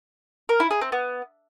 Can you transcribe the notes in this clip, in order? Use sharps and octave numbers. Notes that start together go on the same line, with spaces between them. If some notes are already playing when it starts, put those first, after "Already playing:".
A#4
E4
G#4
C4
B3